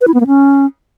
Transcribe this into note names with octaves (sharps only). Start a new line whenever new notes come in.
B4
E4
B3
A#3
C#4